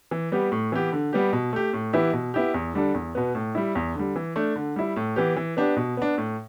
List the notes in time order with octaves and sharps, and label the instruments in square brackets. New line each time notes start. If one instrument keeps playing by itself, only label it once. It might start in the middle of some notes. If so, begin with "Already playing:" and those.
[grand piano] E3
G3 B3 G4
A2
E3 B3 G4
D3
G3 B3 G4
B2
A3 G4
A2
E3 B3 E4 G4
B2
B3 E4 G4
E2
D3 G3 D4 A4
E2
B2 B3
A2
G3 E4
E2
D3 G3
E3
A3 D4
D3
G3 E4
A2
E3 B3 G4
E3
B3 D4 G4
B2
B3 D4
A2